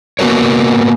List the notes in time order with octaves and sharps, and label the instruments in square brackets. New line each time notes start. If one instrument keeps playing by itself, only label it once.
[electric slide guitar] A#3 B3 F#4 A#4 C#5